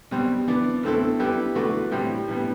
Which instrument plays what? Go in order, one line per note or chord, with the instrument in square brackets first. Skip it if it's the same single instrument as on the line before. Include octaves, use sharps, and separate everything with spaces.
[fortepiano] B2 G3 C4
E3 B3 D4
B2 A3 C4 E4 A4
G3 B3 E4 G4 B4
E3 A3 D4 F#4 B4
A2 G3 C4
A2 E3 G3 B3